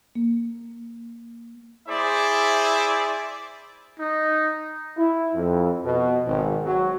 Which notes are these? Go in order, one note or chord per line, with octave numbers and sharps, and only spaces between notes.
A#3
E4 G#4 C5 D5 E5
D#4
E4
F2
B2
G#1
F#3